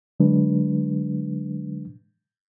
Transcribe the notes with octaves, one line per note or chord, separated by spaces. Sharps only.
D3 F#3 G#3 D4 B4